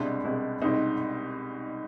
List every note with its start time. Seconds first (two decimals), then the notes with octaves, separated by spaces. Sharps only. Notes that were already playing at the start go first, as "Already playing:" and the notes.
Already playing: C2 B2 G#3 C4 D4 E4
0.24 C2 B2 G#3 C4 E4
0.62 C2 B2 G#3 C4 D#4 E4